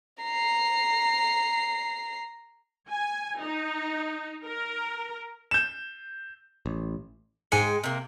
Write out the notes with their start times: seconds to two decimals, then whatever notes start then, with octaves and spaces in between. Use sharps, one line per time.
0.24 A#5 C7
2.90 G#5
3.40 D#4
4.44 A#4
5.51 G6 E7
6.66 A1
7.52 G#2 G#3 G5 G#5 C#7
7.84 C3 A#3